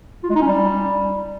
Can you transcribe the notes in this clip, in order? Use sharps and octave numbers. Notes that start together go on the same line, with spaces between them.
F4
G#3
D#4
C#4
G3